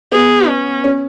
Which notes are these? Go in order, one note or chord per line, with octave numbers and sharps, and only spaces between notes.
B3 G#4
C#4
C#4